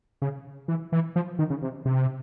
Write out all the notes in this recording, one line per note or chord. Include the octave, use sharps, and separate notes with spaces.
C#3
E3
E3
F3
D#3
C#3
C3
C3